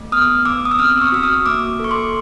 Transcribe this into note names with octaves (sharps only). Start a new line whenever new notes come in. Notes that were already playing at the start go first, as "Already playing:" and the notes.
Already playing: A3
B3 D#6 F6
B3 D6 E6
D#6
E6
C4 D#6 F6
E6
C#6 D#6
F#4 E6
D#6 F6
A#3 D6 E6
A4 C#6
C6 D6